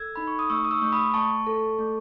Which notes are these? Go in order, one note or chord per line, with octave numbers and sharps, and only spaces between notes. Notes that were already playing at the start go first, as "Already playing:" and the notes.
Already playing: A4 E6 G#6
D#4 B5
C#6
D#6
A3 C#6 E6
D#6
C#6 E6
A3 C#6
B5 D#6
A3 A5 C#6
A4
A3